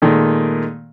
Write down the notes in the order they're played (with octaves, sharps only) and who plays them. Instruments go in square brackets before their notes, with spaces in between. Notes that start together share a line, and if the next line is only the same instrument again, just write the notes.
[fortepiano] A#2 D#3 G#3 A3